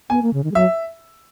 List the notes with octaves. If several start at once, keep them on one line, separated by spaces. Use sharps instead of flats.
B3 G#5
A#3
C#3
D#3
G#3
F#3 E5